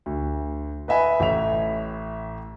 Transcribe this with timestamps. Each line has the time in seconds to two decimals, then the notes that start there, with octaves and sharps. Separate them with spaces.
0.06 D2
0.88 B4 D#5 E5 G#5 B5
1.20 A1 A2 E5 F7